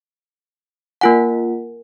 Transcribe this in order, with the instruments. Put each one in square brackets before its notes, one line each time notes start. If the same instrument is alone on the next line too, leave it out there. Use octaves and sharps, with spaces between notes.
[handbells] A#3 F4 F#5 [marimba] A#4 G#5